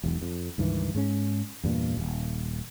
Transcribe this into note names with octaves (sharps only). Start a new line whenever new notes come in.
E1 B1 E2
F2
C#2 G2 D#3 E3
G#2 G#3 C#4
E2 G2 A#2
D#1